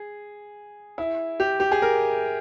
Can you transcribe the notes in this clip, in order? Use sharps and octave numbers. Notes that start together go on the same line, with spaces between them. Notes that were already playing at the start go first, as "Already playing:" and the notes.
Already playing: G#4
E4
G4
G4
G#4
A#4